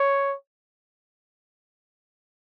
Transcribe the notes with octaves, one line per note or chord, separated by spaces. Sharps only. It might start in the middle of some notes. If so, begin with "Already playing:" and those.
Already playing: C#5